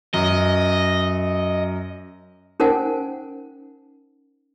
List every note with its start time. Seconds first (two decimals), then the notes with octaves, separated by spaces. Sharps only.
0.14 F#2 D#5
2.60 C#4 D#4 A#4 C5 F#5 G#5